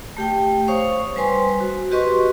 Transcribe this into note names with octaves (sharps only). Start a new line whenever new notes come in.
A3 G4 G5
C5 C#5 F5 C#6 D#6
G3 B4 C5 G#5 C6
F#4
F#4 G4 B4 D#5 C6 C#6